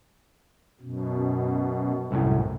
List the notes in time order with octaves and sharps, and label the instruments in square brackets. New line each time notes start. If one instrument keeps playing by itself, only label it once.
[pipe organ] F#2 B2
[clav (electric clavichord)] C2 F#2 A2